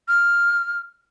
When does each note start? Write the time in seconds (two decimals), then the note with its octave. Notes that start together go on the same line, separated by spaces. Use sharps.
0.08 F6